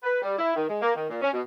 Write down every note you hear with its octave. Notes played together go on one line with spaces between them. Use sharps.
B4
G3
E4
D#3
G#3
A#3
D#3
A#2
C#4
B2